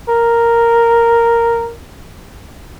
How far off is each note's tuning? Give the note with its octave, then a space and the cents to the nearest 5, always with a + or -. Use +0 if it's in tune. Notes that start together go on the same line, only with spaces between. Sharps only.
A#4 -5